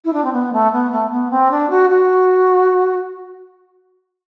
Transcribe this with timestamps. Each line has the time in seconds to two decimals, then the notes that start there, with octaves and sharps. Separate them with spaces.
0.04 E4
0.13 D4
0.24 C4
0.32 B3
0.52 A3
0.72 B3
0.92 A3
1.11 B3
1.31 C4
1.51 D4
1.70 F#4
1.90 F#4